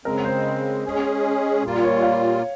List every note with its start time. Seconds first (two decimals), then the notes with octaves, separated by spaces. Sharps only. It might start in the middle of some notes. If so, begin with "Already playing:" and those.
0.05 C#3 G#3 C4 A#4
0.25 C5
0.85 G#3 C#4 G#4
1.63 A#2 G3 A#3 F4
1.84 C#5
2.02 F5